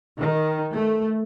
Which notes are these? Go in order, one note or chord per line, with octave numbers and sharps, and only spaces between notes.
D#3
A3